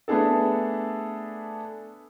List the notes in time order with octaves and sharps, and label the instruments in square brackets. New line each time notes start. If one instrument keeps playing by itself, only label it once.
[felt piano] A3 B3 D4 G#4 A4